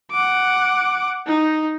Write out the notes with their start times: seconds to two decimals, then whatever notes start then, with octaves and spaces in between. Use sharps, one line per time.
0.11 F#5 D6
1.26 D#4